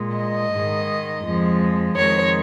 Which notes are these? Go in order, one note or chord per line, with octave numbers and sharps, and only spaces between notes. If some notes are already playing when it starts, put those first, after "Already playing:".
Already playing: A#2 G#3
D#5
G#2 D#3 G#3
F2 F3 G#3
F2 D#3 G#3 C#5